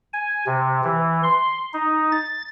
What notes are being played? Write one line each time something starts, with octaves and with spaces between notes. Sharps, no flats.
G#5
C3
E3
C6
D#4
A6